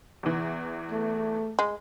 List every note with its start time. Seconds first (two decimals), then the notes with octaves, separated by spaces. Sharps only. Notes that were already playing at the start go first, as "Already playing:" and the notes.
0.23 E2 E3
0.91 A3
1.59 G#3